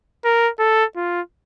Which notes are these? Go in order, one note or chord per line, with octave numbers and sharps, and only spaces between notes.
A#4
A4
F4